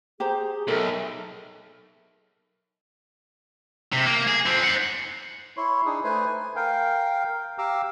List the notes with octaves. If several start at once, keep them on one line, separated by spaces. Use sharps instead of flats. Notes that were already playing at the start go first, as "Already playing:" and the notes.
G4 G#4 C5 A#5
B1 A4 A#4 E5
C3
A#3
G#4
F3 C4
C5 F#5
E4 C#5 C6
D4 D#4 G#4
A3 B4 C5 G#5
G#5
A#4 F5 G5
G4 F5 A#5 D6 E6